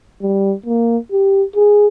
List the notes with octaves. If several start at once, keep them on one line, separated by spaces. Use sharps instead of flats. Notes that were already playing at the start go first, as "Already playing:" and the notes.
G3
A#3
G4
G#4